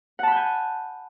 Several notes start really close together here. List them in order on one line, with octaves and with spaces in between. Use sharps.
F#5 A5 B5 G6 G#5